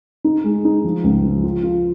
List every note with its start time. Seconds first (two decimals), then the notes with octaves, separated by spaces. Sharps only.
0.24 D#4
0.44 G#3
0.65 D#4
0.85 F3
1.04 C#2
1.24 F3
1.44 F4
1.63 F4